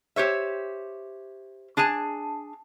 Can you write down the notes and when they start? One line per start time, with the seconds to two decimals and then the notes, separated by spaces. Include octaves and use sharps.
0.16 G4 C5 C#5 E5
1.77 D4 G#4 G#5 A5